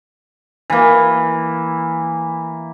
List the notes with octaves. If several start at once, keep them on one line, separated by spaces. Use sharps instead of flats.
E3 A#3